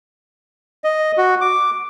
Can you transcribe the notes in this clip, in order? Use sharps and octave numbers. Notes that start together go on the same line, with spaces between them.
D#5
F#4
D6